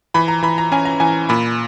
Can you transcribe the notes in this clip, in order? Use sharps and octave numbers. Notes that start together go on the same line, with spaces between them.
E3 B5
A#5
E3 B5
A#5
C#4 G#5
A#5
E3 G#5
A#2 B5